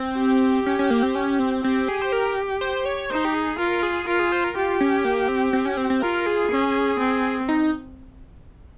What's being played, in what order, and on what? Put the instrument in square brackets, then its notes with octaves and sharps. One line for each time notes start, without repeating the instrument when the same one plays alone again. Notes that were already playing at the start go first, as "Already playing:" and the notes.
Already playing: [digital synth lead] C4
[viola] G4
[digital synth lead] C#4
C#4
A#3
C4
C#4
C4
[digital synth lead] C4 [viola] G4
[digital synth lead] G#4
C5
A#4
C5
C#5
[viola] D#4 [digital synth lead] C5
[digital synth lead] G4
G#4
[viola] F4 [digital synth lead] A#4
[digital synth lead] G#4
[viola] F4 [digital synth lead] A#4
[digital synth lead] G#4
C5
A#4
[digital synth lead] F4 [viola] G4
[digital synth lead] C#4
A#3
C4
C4
C#4
C4
C4
[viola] F4 [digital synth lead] A#4
[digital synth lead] G#4
[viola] C#4
C4
[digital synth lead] D#4